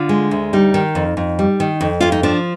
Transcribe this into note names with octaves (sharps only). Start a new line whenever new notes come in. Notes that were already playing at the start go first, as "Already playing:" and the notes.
Already playing: D3 F4
G#3
D2
G3 D#4
D#3
F2
F2
G3
D#3
F2
F2 F4
D#4
F3 D4